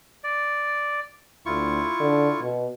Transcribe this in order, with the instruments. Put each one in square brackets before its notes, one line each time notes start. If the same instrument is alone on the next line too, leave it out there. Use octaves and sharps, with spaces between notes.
[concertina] D5
[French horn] D2 [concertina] E4 F4 C#6
[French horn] D3
B2